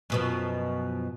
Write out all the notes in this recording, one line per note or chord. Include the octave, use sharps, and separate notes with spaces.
F#2 B2 F3